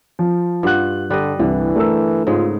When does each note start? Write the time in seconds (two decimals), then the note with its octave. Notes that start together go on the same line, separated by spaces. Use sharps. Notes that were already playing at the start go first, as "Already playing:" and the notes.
0.19 F3
0.63 G2 F4 F#5 F#6
1.10 D3 G3 D#5 F#6
1.39 C2 D3 E3
1.76 A3 A#4 E6
2.27 G#2 C#3 G#3 F4